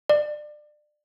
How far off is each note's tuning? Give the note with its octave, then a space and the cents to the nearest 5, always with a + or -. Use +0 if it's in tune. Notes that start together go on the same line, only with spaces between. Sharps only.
D5 +25